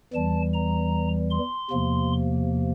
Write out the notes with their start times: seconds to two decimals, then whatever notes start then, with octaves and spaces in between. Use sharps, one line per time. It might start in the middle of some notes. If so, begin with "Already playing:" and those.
0.13 E2 E3 G3 A5
0.53 A#5
1.31 C6
1.71 E2 C3 F3 A#3